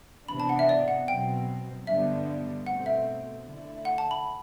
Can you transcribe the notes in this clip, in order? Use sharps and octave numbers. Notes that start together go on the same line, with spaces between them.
C3 E3 B3 D4 B5
A5
F#5
E5
D5
F#5
B2 F#3 C4 G5
G2 D3 G3 B3 D4 E5
B2 A3 C4 F#5
E5
D3 A3 E4
F#5
A5
B5